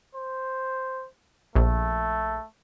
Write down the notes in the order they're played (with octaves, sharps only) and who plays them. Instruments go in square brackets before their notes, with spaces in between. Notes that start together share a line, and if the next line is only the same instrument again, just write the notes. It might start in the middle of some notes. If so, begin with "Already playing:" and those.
[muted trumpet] C5
[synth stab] A#1 [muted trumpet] A3